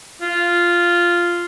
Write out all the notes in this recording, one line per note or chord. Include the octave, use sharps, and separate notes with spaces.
F4